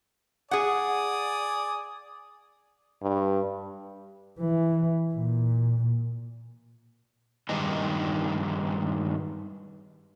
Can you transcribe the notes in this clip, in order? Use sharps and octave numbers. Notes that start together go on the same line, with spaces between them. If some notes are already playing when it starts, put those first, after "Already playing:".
G#4 D5 F#5 G#5 D#6
G2
E3
A#2
G2 D#3 G#3 D4 D#4